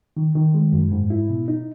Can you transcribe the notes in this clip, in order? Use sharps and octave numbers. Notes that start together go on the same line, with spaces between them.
D#3
D#3
G#3
F#2
G#2
E4
B2
D#4